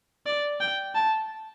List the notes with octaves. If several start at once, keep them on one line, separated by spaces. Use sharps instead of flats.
D5
G5
A5